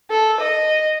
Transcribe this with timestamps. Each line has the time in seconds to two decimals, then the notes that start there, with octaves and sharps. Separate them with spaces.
0.10 A4
0.40 D#5